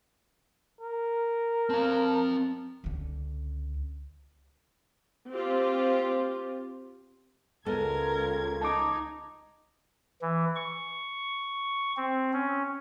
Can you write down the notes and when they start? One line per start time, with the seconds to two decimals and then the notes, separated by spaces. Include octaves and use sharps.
0.81 A#4
1.70 C4 F5 A5
2.84 C#2 D3
5.32 C4 F4 G4
7.66 C#2 G#3 B3 A4 A#4 G#6
8.61 D#4 A5 D6
10.22 E3
10.56 C#6
11.97 C4
12.33 C#4